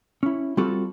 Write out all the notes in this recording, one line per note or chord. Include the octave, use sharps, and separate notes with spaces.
C#4 E4
G3 C4 F4 F#4 A4